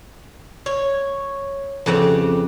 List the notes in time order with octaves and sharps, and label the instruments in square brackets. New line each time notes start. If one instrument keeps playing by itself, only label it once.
[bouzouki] C#5
[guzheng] F2 C#3 F#5 [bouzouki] C4 G4 B4